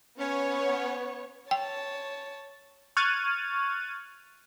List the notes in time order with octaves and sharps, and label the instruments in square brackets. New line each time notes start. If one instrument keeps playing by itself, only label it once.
[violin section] B3 C#5 [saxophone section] C#4
[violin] C#5 A5 [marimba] G5
[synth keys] C#6 F6 F#6 G#6 A6 D#7